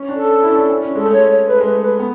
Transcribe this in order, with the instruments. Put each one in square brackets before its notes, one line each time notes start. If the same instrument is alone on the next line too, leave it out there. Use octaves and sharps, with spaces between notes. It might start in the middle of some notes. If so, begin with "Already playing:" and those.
Already playing: [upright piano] C#4
D4
[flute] A4
[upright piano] E4
C#4
D4
C#4
C#4
[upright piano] G#3 [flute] A4
[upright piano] A3
[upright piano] G#3 [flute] C#5
[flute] C#5
[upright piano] A3 [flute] B4
[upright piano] G#3 [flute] B4
[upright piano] A3
[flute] B4
[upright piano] B3